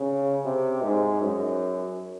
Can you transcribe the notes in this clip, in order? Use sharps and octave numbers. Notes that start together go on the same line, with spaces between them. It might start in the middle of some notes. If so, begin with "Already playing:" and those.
Already playing: C#3
C3
G#2
F#2